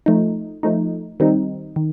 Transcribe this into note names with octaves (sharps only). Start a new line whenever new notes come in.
F3 A3 D#4
F3 A3 D#4
D#3 G3 C4 D#4
D#3